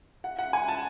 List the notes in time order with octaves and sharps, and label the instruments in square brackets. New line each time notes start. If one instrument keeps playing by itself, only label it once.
[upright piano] F#5
F#5
G#5
A5